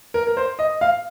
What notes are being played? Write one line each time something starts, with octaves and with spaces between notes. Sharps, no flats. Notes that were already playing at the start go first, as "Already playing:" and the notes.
A#4
A#4
C5
D#5
F5